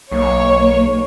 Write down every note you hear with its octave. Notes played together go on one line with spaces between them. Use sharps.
B1 A#3 C#5